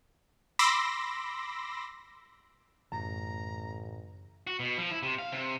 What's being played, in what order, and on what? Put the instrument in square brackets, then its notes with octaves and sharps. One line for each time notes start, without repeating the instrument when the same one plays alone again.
[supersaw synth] B5 C6 D6 E6 A#6
[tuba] A1 [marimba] F#2 [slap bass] A2 C#3 [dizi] A#5
[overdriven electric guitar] F#4
B2
F3
E4
C3
F5
C3